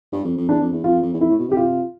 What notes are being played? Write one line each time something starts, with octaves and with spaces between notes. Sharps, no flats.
G2
F2
F2
E2 D4
F2
E2
F2 F4
F2
E2
F2 E4
A2
B2
C3 G4
F4